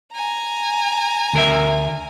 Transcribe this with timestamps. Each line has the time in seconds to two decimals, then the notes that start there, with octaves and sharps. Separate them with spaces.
0.13 G#5 A#5
1.33 D2 A#4 E5